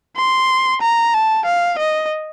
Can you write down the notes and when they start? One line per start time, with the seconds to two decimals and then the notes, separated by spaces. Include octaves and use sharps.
0.16 C6
0.82 A#5
1.14 A5
1.45 F5
1.79 D#5